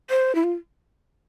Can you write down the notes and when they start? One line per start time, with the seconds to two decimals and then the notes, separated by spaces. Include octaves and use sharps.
0.10 C5
0.35 E4
0.44 F4